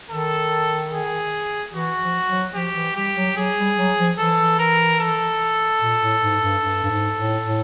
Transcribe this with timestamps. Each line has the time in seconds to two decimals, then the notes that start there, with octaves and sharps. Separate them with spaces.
0.10 D#3 A4
0.92 G#4
1.73 E3 F#4
2.01 F3
2.27 F#3
2.55 F3 G4
2.75 E3
2.96 G3 G4
3.16 F#3
3.37 F#3 G#4
3.57 G3
3.77 F#3
3.98 F3
4.18 E3 A4
4.59 A#4
5.00 A4
5.81 A#2
6.02 A2
6.22 G#2
6.42 G2
6.63 G2
6.84 G2
6.90 G#2
7.18 A2
7.45 A2